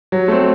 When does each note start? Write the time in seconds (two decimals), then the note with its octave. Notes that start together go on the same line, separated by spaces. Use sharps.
0.12 F#3
0.28 A3 C4